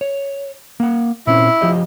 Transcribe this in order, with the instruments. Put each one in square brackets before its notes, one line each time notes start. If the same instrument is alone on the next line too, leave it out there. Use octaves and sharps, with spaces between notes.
[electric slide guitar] C#5
A#3 F#5
[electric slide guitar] A#2 C4 C#4 [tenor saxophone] E4
[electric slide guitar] F3 G4 D#5